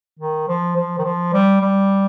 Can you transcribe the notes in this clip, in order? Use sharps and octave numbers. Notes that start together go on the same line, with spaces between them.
D#3
F3
F3
D#3
F3
G3
G3